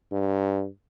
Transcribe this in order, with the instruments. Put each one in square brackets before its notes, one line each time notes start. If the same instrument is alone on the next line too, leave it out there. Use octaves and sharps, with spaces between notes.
[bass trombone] G2